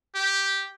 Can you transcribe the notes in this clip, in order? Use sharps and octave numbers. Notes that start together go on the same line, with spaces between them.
G4